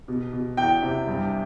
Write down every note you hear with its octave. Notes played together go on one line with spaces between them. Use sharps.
B2
B2
E2 G5
C3
G2